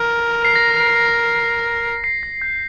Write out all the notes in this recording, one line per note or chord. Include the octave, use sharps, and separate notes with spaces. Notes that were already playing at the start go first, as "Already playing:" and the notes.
Already playing: A#4
C7
A#6
C7
A#6
G6